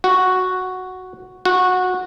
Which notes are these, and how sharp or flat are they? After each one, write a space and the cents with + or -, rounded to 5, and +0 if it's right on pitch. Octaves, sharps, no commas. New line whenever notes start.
F#4 +0
F#4 -15